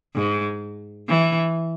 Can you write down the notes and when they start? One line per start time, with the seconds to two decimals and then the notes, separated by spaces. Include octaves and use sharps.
0.15 G#2
1.08 E3